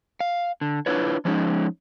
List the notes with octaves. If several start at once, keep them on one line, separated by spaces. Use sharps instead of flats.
F5
D3
D4 E4 F4 B4 C#5
F3 G#3 C#4 D#4